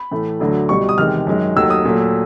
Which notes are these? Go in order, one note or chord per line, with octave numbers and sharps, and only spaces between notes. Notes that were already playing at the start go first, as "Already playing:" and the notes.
Already playing: B5
A2 E3 A3
D2 D3 F#3 A3
C2 B2 G3 C#6
D#6
E2 C3 D#3 G#3 F6
F#2 D#3 G#3
D#2 D#3 F#3 A3 E6
D#6
A#2 F#3 A3